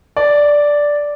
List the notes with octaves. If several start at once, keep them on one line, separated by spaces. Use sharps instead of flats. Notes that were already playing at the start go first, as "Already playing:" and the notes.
D5